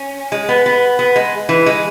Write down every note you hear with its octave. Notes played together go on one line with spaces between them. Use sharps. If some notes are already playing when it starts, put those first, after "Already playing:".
Already playing: C#4
G#3
B3
B3
B3
G#3
E3
G#3